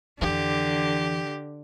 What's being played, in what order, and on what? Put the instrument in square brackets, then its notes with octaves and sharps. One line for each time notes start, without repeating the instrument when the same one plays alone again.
[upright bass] F2 E3 [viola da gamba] D3 [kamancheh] G4